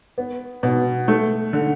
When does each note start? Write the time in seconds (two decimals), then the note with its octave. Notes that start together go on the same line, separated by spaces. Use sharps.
0.18 B3
0.63 B2
1.08 A3
1.53 D3